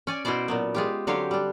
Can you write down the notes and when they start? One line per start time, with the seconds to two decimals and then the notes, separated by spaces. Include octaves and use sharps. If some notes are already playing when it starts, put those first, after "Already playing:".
0.07 C#4 D5 G#5
0.25 B2 C#4 E4 C5 D5
0.48 A#2 F#3 B3
0.75 G#3 F4 G4
1.07 D3 F#3 C4 G4 C#5 F5
1.31 G3 D4